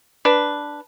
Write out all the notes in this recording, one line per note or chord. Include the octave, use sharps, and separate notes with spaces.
D4 B4